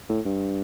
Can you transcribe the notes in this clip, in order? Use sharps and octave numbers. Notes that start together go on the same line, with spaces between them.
A2
G2